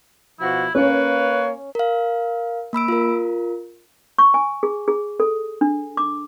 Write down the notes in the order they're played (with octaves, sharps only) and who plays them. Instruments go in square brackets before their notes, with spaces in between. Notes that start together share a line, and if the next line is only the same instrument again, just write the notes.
[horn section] B2 F3 F#4 [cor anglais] E4
[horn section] A#3 C#5 [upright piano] C#4 [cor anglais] B4
[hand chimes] A#4 F5
A#3 B5 E6 D7
F4 A#4
[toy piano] C#6
G#5
G#4
G#4
A4
D4
D6